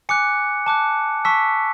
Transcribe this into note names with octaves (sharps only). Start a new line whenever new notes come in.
G#5 D6 F#6 C#7
A5 D6 F#6
A5 C#6 E6 B6